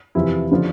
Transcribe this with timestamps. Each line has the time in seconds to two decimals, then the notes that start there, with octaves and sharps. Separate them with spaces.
0.15 E2 C3 F3 E4
0.52 D3 F3